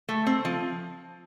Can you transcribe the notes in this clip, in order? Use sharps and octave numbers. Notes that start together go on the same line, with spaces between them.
A3
C4
F3